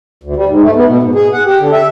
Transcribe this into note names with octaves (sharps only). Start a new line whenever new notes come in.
D2
G3
G#2
A3
B3
B2
G#2
G#4
F#5
G4
D3
E5